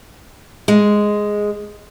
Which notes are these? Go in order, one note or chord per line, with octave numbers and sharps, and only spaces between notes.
G#3